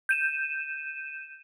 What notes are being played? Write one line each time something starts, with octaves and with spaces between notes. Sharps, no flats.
G6 D#7 E7